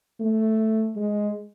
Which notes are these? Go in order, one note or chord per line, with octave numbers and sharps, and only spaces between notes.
A3
G#3